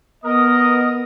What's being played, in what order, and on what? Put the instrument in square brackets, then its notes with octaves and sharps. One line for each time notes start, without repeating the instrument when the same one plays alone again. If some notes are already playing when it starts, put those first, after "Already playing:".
[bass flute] B3 [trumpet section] A#4 D#5 [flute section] D#6